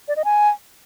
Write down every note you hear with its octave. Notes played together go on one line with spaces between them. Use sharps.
D5
D#5
G#5